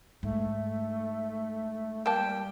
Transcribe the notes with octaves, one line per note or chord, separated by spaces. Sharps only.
G#2 A3
G3 A#3 G5 A5